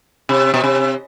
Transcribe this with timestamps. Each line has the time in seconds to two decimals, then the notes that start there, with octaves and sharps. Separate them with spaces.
0.29 C3
0.54 B2
0.64 C3